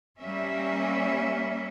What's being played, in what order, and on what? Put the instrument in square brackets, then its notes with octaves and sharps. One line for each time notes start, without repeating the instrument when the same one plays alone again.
[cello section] G3 A#3 C#4 E5